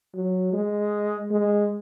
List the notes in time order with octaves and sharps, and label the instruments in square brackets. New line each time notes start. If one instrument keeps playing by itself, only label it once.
[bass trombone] F#3
G#3
G#3